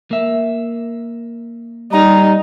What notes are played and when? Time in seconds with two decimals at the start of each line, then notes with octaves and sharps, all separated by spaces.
0.11 A#3 E5
1.92 G3 D#4 A#5